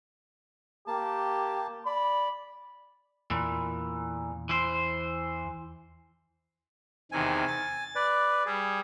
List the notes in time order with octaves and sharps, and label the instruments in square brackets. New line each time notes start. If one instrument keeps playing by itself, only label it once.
[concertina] A#3 A5 [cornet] G4
[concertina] D5 [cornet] B5
[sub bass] E2 [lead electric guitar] A#2 E3
[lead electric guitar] E3 C5
[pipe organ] E2 C3 D#3 [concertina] G#5
[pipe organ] A6
[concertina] B4 D5
[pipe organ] G3 [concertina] G#4